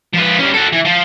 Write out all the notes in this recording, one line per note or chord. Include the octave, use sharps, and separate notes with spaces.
F3 B4
G3 C#4
F#4 A4
E3
F3